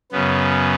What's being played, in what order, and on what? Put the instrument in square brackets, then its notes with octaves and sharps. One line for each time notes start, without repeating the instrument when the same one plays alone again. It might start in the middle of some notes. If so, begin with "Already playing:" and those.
[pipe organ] F#2 C#3 B3